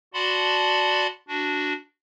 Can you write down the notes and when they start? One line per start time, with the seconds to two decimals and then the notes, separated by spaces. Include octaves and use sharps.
0.14 F#4 D5 F#5 A5 B5 C6
1.28 D4 F#4